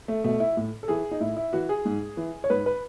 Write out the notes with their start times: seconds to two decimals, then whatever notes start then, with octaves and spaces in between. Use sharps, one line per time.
0.08 A3
0.24 B2 A3
0.40 E4
0.57 A2
0.83 A4
0.88 E3 G#4
1.11 D#4
1.20 A2 E4
1.36 E4
1.53 E3 F#4
1.69 G#4
1.85 G#2
2.17 E3
2.44 C#5
2.50 G#2 B4
2.66 B4